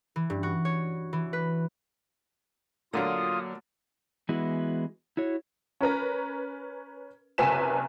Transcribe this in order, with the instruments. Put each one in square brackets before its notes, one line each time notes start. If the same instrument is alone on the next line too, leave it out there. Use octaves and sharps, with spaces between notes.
[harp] E3
G2
F#4
C#5
E3
B4
[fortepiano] A#2 D3 [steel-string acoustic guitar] F#3 A#3 [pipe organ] F4 D#6
[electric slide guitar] E3 G#3 B3 E4 F#4
E4 F#4 C#5
[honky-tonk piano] C#4 A#4 B4 A#5
F#1 C3 B4 G#5 B6 E7